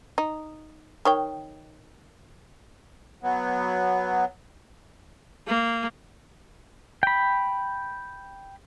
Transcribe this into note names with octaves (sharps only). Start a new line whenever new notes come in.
D#4
D#3 C#5 G5
F#3 B3
A#3
G5 B5